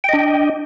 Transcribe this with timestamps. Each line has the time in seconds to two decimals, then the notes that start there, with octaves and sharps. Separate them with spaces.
0.04 G5
0.09 D#5
0.13 D4